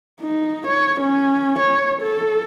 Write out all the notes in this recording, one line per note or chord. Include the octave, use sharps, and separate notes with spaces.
D#4
C#5
C#4
C#5
A4